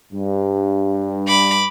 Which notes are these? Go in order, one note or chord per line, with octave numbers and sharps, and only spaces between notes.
G2
B5 D6